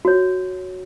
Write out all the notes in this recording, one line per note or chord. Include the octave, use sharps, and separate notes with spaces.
F#4 C#5